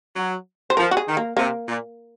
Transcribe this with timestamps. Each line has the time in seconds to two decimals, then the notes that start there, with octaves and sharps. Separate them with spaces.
0.16 F#3
0.70 C5
0.77 F3 A#4
0.91 F#4
0.97 G#4
1.07 D#3
1.17 A#3
1.37 C3 A#3
1.67 A#2